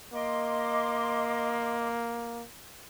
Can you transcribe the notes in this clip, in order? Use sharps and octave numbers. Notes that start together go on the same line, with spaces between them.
A#3 D#5 C6 D6